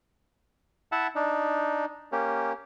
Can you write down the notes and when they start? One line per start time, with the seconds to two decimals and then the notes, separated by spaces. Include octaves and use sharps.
0.92 E4 E5 F#5 A5
1.15 D4 D#4
2.12 A#3 C#4 G4